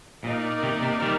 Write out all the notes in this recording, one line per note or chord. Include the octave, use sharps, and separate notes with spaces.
A#2 A#3 D#4 A#4 D5
C3 D#3
C3
D#3 G3